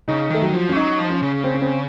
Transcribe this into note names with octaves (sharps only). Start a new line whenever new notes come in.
C#3 D#4
D#3 A3
F#3
F3
C#4
A3
F#3 D#4
F3
C#4
C#3
C4
C#4
C4